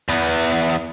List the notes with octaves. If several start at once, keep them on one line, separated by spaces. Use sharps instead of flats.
E2 B3